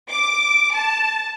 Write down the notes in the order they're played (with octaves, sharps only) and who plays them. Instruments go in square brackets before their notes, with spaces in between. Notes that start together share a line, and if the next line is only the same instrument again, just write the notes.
[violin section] D6
A5